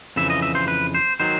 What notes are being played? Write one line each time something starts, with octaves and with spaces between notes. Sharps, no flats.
F2 C#3 E3 E5
D#5
E5
C5
B4
C5
D#3 F#3 C5